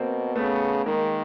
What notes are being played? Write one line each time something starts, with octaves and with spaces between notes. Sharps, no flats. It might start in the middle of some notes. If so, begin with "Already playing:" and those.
Already playing: B2 A#3 C4
C#3 A3 B3
D#3 G#3 A#3